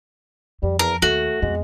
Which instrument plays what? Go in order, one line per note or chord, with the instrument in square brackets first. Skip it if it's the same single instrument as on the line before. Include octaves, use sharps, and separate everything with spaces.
[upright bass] F2 [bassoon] G3
[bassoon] E2 [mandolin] A#4
[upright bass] D#2 [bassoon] A3 [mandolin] F#4
[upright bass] F2 B3 [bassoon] G#3